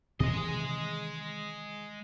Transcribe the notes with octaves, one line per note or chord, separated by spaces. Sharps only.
C3 D#3 E3 G#3 D#5